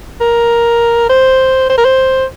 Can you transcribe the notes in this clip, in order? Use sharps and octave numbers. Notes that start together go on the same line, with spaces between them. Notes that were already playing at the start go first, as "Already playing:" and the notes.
A#4
C5
C5
A#4
C5